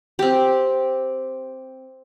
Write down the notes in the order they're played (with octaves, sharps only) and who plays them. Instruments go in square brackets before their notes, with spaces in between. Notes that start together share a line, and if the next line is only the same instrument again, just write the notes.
[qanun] C4 G4